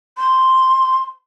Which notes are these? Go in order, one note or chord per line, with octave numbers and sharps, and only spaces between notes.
C6